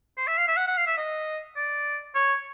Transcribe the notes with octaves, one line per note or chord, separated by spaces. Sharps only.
C5
E5
F5
E5
F#5
F#5
F5
E5
D#5
D5
C#5